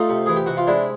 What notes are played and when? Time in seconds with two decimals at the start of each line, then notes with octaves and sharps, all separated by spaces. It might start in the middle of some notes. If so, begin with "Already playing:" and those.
Already playing: A3 D#4 F4
0.09 C3
0.26 E3 G#4
0.36 G4
0.46 C3 F#4
0.57 F4
0.67 G#3 D4 E4